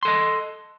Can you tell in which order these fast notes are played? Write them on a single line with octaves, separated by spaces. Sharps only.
C6 A4 D#5